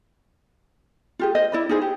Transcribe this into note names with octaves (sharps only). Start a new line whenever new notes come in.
F4 G4 G#4
C5 D#5
E4 D5 B5
D#4 F4 G#4 C5
G4